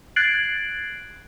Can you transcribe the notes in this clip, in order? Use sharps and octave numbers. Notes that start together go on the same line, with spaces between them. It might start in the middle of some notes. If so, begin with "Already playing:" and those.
F#6 G#6 A6 C7 D7 F#7